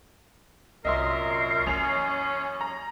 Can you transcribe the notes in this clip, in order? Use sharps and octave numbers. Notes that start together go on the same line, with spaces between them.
C2 F#2 A#2 A#4 D#5 E5 C6 C7
F#2 E3 A#3 C#4 F7
A#5